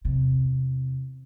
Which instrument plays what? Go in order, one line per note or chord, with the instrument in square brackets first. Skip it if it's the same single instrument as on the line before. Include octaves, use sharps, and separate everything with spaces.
[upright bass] E2 C3